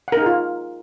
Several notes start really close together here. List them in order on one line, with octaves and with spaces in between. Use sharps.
F#5 A#4 D#4 G#4 F4